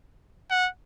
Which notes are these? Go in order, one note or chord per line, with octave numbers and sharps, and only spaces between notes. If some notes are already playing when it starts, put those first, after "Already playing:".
F#5